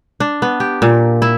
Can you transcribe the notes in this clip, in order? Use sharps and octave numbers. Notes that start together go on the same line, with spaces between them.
D4
B3
G4
A#2
E4